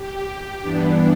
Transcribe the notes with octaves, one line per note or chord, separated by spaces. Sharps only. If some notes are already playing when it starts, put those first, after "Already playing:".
Already playing: G4
G2 E3 B3 D4